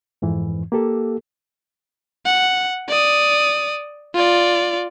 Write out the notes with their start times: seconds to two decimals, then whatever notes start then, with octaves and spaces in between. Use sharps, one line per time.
0.22 F2 G#2 E3
0.72 A#3 G4 A4
2.26 F#5
2.89 D5 D#6
4.15 F4 D5